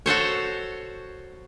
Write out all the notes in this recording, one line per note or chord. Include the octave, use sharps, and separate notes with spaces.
F#4 A4 C5 C#5